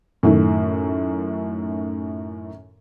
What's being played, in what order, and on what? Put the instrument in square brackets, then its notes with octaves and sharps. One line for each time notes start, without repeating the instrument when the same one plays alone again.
[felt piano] F#2 A2 D#3